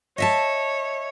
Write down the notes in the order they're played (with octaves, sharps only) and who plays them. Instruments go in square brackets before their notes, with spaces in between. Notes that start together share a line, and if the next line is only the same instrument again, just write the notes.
[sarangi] C#5 [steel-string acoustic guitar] D#5 E5 A5